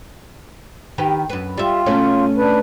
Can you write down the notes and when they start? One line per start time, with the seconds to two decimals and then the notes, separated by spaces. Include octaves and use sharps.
0.98 D#3 G4 B4
1.30 F#2 B4
1.58 G3 F4 E5
1.86 B2 A3 C#4
2.37 D4 B4